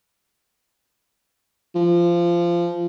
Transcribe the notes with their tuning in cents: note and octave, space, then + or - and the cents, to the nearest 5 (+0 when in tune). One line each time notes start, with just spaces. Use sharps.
F3 -20